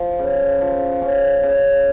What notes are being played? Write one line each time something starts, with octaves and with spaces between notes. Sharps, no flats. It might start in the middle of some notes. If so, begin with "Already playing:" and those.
Already playing: F3
C#3
F3
C#4
C#3